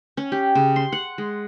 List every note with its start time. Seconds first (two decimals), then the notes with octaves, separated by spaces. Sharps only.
0.17 C#4
0.32 G4
0.55 C#3
0.76 C6
0.92 F#5
1.18 G#3